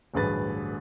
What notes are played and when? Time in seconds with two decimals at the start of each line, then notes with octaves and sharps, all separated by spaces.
0.14 D1 A1 G2 G#4 B4 A6